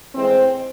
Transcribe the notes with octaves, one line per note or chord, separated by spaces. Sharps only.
A2 E3 G#3 C4